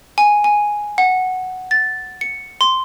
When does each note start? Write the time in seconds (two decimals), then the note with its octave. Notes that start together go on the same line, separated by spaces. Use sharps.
0.18 G#5
0.44 G#5
0.98 F#5
1.71 A6
2.21 C#7
2.61 C6